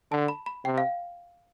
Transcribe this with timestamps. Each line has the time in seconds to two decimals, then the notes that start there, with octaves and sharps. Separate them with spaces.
0.11 D3 A5
0.28 B5
0.46 B5
0.65 C3 G5
0.78 F5